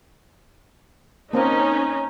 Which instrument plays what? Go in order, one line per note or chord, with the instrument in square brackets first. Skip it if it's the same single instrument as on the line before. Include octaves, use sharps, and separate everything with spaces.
[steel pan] A#3 C4 [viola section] C#4 D#4 [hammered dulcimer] A#4 A5